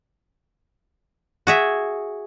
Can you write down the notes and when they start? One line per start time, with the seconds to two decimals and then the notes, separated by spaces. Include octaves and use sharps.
1.47 F#4 G#4 E5